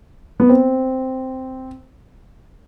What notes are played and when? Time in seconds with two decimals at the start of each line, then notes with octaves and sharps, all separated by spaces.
0.40 B3
0.49 C4